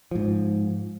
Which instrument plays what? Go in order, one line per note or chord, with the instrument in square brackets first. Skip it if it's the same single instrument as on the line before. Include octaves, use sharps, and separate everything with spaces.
[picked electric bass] G#2 F3